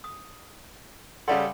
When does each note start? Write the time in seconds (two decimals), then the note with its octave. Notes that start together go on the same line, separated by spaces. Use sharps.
0.04 D#6
1.28 C#3 G3 A4 D5 F#5 C6